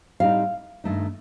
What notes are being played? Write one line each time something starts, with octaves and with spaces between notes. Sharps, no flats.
A2 G3 C4 D#4 F5
G2 D#3 A3 D#4